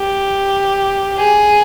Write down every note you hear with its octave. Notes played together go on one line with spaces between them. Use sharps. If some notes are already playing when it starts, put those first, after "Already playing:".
Already playing: G4
G#4